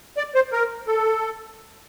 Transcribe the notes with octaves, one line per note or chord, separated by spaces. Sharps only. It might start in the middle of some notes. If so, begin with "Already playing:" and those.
D5
C5
A#4
A4